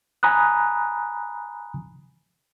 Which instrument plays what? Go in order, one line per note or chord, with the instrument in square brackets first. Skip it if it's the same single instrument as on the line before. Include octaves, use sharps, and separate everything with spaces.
[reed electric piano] G#5 A#5 B5 D#6 F#6